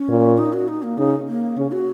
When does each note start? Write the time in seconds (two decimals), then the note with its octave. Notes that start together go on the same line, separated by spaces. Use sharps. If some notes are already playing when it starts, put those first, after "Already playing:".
Already playing: C#4
0.08 A#2
0.38 D#4
0.53 F#4
0.68 D#4
0.83 A#3
0.98 C#3 D#4
1.28 A#3
1.57 C#3 C#4
1.72 F#4